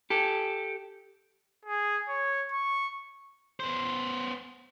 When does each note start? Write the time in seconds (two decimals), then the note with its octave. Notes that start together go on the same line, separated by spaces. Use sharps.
0.10 G4 A4
1.65 G#4
2.09 C#5
2.52 C#6
3.60 B3 C5